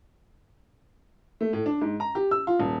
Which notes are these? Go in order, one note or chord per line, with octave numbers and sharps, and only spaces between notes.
A3
A2
D4
G#2
A#5
G4
E6
F4
D#1